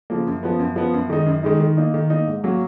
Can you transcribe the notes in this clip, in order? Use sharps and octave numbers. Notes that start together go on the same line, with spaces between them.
C#3 F3 A#3
F#2
F3 B3
F#2
F3 B3
F#2
D#3 G#3 D#4
F#2
D#3 G#3 D#4
D#3
A#3 D#4
D#3
A#3 D#4
G#2
F#3 A#3 C#4 F#4